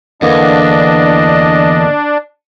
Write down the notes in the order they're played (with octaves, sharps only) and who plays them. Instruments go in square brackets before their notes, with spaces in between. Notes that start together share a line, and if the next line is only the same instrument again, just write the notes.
[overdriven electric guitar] E2 [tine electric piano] D3 A#3 B3 [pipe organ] D4 [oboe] D#5